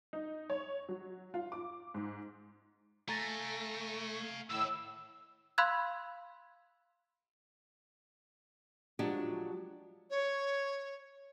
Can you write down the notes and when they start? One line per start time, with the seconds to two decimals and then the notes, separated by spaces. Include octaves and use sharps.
0.13 D#4
0.50 C#5
0.89 F#3
1.34 F4
1.52 D6
1.94 G#2
3.08 A3 F5 G#5 A#5 A6 A#6
4.50 C#2 A2 D#3 E6
5.58 F5 B5 C6 E6 F#6 G#6
8.99 F3 F#3 G#3 D4 F#4 G4
10.10 C#5